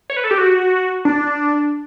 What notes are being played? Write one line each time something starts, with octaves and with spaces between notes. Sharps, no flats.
C#5
B4
A4
G4
F#4
D4